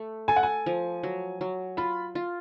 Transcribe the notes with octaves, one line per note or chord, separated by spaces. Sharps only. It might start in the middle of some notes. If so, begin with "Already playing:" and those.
Already playing: A3
A4 G#5
F#5
G#5
F3
F#3
F#3
F4 B5
F4